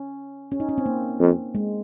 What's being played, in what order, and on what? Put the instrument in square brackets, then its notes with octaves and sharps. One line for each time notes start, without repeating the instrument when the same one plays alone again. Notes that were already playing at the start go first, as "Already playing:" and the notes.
Already playing: [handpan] C#4
C#4
D#4
C#4
C4
A#3
[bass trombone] F2
[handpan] G#3